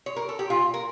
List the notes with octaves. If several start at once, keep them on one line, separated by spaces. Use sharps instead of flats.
C#5
A#4
A4
G4
A#2 F4
A#4